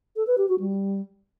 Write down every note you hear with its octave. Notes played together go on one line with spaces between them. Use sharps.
A4
B4
G4
F#4
G3